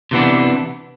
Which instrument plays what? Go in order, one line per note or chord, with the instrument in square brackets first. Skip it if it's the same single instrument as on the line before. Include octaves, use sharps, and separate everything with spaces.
[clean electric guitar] C3 E3 B3 D4